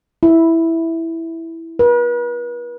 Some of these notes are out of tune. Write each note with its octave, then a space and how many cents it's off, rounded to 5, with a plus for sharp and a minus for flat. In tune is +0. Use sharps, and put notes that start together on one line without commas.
E4 -5
B4 -40